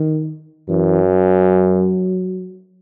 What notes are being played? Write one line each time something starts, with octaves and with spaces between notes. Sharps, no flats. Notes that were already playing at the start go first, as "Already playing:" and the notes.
Already playing: D#3
F#2 E3
F#3